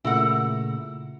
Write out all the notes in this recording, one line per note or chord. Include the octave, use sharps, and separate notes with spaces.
A#2 C#3 A3 E4 A#4 F#5